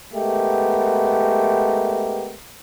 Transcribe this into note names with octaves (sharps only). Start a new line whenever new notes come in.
G#3 A3 B3 G4 A#4